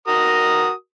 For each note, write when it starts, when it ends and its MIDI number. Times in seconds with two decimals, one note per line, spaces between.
0.08 0.71 66
0.08 0.71 70
0.08 0.71 87